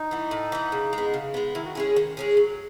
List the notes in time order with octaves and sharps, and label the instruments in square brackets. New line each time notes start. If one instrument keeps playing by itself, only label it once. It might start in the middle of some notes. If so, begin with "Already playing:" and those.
Already playing: [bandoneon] D#4
[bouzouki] E3 B3
A2
E3 B3
C#3
G#3
B3
C#3
G#3 B3
[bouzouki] D#3 [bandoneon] E4
[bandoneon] F#4
[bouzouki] G#3 C#4 G#4 [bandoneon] E4
[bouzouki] D#3
G#3 C#4 G#4
F#3